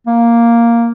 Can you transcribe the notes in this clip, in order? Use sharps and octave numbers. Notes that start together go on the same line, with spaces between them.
A#3